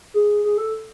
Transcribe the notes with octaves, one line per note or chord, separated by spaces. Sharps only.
G#4
G#4
A4